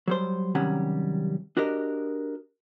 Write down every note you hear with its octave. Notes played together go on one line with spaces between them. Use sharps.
F#3 G3 C5
C3 D#3 F#3 G3 C#4 F#5
D4 F#4 G4 A#4 D#5